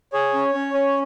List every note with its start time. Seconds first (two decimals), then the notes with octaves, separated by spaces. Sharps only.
0.13 G#4 C#5
0.34 C#4
0.54 C#4
0.74 C#4